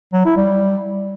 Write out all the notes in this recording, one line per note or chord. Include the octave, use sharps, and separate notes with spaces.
F#3
E4
G3